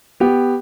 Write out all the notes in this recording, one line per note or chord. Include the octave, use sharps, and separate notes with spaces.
B3 G4